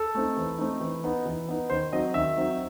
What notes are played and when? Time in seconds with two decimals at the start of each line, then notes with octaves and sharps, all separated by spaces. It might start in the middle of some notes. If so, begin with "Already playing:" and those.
Already playing: A4
0.15 A3 C4 D#4
0.37 E3
0.58 A3 C4 D#4
0.80 E3
1.04 B3 D#4
1.26 E3
1.48 B3 D#4
1.70 D#3 C5
1.92 F#3 C4 D#4 D#5
2.14 D#3 E5
2.37 F#3 C4 D#4